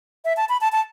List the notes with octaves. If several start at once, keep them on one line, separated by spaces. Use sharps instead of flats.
E5
A5
B5
A5
A5